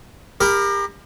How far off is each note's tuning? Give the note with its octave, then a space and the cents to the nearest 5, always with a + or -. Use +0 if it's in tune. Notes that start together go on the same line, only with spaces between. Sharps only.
G4 +35 A#4 +0 B5 +0